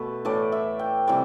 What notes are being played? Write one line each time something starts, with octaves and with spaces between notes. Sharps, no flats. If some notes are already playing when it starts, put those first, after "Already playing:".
Already playing: B2 A3 B4
A2 E3 A3 D5
E5
G5
C3 E3 G3 D5